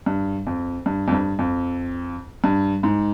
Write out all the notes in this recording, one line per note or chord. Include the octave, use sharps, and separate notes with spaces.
G2
F2
G2
F2
G2
F2
G2
G#2